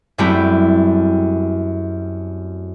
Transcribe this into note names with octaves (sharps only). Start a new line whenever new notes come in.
F#2 G3 A3 C4 E4